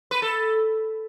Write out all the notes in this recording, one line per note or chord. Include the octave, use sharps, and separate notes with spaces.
B4
A4